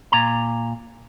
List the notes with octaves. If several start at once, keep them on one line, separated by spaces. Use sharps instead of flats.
A#2 A#5